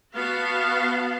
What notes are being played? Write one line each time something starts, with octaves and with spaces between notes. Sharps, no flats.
B3 F#4 F5 A5